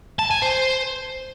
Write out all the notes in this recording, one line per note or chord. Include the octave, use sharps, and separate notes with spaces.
A5
G#5
C5